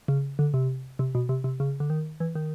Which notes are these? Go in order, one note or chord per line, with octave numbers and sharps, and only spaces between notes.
C#3
D3
C3
C3
B2
C3
C3
C#3
D3
D#3
E3
D#3